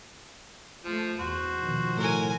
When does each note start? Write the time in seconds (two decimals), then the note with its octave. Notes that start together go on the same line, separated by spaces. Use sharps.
0.84 F3 A3
1.19 E2 F#4 C5
1.58 B2 D#3 F3
1.97 A2 A#4 G#5